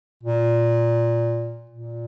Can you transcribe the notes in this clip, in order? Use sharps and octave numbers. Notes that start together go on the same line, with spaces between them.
A#2
A#2